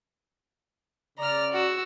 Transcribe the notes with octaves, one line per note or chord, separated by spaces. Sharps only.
C#3 D5 A#5 F6
F#4 E6